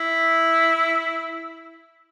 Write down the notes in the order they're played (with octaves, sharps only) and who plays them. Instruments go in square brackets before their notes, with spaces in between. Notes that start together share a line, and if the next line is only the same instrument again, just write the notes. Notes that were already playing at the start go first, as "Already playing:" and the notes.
Already playing: [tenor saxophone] E4